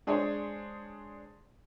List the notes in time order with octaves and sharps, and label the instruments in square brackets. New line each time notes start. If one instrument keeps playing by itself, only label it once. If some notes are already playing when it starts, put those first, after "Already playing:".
[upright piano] G#3 D4 G#4 C5 C#5